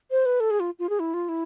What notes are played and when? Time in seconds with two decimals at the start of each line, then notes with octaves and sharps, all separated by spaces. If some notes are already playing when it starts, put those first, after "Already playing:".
0.11 C5
0.26 B4
0.40 A4
0.51 G#4
0.60 F4
0.79 F4
0.89 G#4
1.00 E4
1.14 F4
1.29 E4